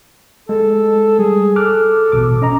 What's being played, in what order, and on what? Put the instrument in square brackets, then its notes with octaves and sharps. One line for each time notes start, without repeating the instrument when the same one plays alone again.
[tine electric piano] G#3 [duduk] A4
[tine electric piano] G3 [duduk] G#4
[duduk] A4 [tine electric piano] D6 F6 F#6
[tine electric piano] A1 B2 D6
C#4 D#5 A#5